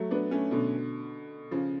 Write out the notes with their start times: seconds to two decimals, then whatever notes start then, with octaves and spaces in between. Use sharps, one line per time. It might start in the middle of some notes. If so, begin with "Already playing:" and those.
Already playing: F#3 A3
0.11 B3 D4
0.31 A3 C#4
0.51 B2 D3
1.51 C#3 F3